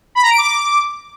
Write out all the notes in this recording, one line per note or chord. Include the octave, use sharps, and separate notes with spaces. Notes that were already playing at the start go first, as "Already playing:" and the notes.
B5
A#5
D7
D6